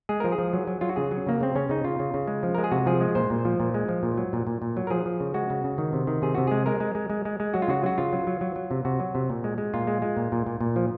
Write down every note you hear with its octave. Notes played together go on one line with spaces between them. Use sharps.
G#3 G#4
F3 A#4
G#4
F3
F#3
F#3
F#3 F4
F#4
C#3 G#4
F#3
C#3 A#3
C#3 C4
C#3 C#4
C#3 D#4
C#3 F4
C#3
C#3
G#3
F3
G#3 A#4
G#4
C3 F#4
F3 G#4
G#3
A#2 C5
A#2
F3
A#2
G#3
F3
A#2
F#3
A#2
A#2
A#2
F#3
A#4
F3 G#4
F3
C#3
G#3 F#4
C#3
C#3
D#3
C3
D#3
C3 G#4
C3 F#4
G#3 G#4
G#3 A#4
G#3
G#3
G#3
G#3
G#3
F#3 F#4
F4
C#3 F#4
F#3 F#4
C#3 F4
F#3
F#3
F#3
F#3
C3
C3 F#4
F#3
C3
A#2
G#3
G#3
A#2 F4
G#3
G#3
A#2
A#2
A#2
A#2
F3